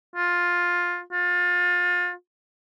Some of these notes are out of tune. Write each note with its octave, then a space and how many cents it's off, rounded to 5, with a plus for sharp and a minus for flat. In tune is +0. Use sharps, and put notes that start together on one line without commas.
F4 +10
F4 +30